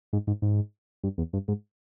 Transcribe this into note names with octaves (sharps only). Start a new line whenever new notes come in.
G#2
G#2
G#2
G2
E2
G2
G#2